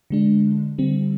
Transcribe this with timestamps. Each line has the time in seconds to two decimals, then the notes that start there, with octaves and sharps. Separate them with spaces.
0.10 D3 G#3 D4
0.78 D3 G3 C4